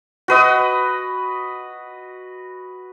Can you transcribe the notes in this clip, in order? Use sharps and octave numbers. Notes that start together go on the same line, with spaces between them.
F#4 B4 D#5